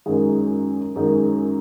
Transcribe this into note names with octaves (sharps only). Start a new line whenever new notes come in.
F#2 D#3 G#3
F#2 D#3 G#3